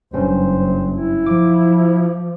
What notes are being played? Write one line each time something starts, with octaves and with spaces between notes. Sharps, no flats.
F#1 G2 C#4 C5
E4
F3 D6